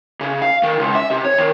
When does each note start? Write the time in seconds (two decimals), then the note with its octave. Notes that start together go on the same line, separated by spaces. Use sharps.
0.21 C#3
0.42 F5
0.63 D#3
0.79 C#2
0.95 E5
1.10 C3
1.25 C#5
1.38 D#3